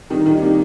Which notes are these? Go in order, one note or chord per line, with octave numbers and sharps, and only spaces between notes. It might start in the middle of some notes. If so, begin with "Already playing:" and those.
D#3 G3 D#4
D#3 G3
C#4
G3 A#3 D#4